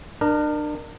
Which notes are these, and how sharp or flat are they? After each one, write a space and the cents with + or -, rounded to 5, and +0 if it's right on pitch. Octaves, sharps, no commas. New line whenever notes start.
D4 +35 A#4 +0